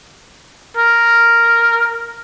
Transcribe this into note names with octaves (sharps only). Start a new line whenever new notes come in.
A#4